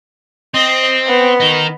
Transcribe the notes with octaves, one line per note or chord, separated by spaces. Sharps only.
C4 D#5
B3
D#3 D#4